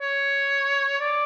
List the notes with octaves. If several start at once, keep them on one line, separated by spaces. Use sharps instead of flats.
C#5
D5